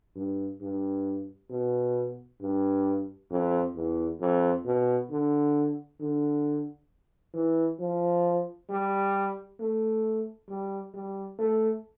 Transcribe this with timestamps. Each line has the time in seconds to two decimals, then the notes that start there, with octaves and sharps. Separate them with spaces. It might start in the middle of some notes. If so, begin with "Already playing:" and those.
0.16 G2
0.61 G2
1.50 B2
2.41 G2
3.30 F2
3.75 E2
4.20 F2
4.65 B2
5.10 D3
6.00 D3
7.34 E3
7.79 F3
8.70 G3
9.60 A3
10.49 G3
10.94 G3
11.39 A3